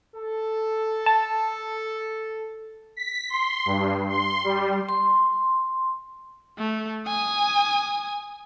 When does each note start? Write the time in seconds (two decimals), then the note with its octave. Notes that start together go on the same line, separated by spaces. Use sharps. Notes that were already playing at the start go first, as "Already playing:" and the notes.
0.16 A4
1.06 A5
2.96 B6
3.29 C6
3.66 G2
4.09 C6
4.44 G3
4.89 C6
6.58 A3
7.07 G#5 D#6